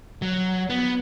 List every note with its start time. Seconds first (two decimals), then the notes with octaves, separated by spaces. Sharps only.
0.22 F#3
0.70 B3